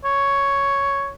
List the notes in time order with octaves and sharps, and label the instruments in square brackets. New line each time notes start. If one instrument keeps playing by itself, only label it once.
[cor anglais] C#5